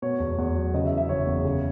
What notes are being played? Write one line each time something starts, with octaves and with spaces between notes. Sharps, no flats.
B2 C#5
E2
E2
F#3
C#3 D#5
E5
E3
E5
F#1 C#5
E2
C#3